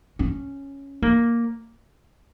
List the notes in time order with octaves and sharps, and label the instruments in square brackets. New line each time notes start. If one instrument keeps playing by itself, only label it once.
[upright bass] C#4
A#3